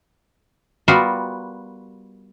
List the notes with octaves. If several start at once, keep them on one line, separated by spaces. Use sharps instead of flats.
G3 B3 F4 F#4 A#4